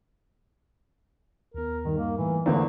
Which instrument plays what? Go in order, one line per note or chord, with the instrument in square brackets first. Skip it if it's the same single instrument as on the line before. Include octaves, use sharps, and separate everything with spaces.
[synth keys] D#2 B3 [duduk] A#4
[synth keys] G2 G3 D#4 [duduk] D#3
[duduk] A#3
[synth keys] A2 G3 A3 [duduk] E3
[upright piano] E2 D3 A#3 [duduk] A3 [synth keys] C5 D5